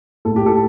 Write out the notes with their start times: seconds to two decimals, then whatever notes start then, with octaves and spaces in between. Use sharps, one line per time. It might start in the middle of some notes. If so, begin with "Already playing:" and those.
0.25 A2 A4
0.36 G4
0.46 A4